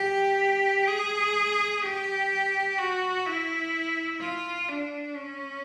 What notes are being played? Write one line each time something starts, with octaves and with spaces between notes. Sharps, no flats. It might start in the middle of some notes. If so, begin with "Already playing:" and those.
Already playing: G4
G#4
G4
F#4
E4
F4
D4
C#4